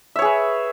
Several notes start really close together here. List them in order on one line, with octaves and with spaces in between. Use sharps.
E5 C#5 G#4 B4